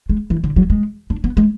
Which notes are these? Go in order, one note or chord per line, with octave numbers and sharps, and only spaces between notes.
G#3
E3
D3
F#3
G#3
D4
B3
G#3